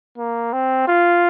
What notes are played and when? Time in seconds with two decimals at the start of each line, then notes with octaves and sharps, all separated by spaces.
0.18 A#3
0.53 C4
0.87 F4